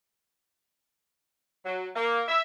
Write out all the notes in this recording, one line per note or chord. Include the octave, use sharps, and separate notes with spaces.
F#3
A#3
E5